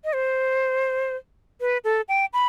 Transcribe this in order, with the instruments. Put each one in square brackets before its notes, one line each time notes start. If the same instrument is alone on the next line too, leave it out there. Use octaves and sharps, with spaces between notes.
[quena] D#5
C5
B4
A4
G5
B5